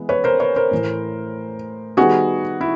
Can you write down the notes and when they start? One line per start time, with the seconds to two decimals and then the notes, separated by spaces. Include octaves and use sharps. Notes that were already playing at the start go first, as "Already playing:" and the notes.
Already playing: E3 G#3 B3
0.09 B4 C#5
0.24 A#4 C5
0.40 B4 C#5
0.56 A#4 C5
0.71 A2 E3 A3
1.97 D#3 G3 B3 F#4 G#4
2.61 E4